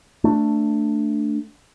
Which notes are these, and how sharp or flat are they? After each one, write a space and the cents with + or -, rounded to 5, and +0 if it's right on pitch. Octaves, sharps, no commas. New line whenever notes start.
A3 +10 D4 +0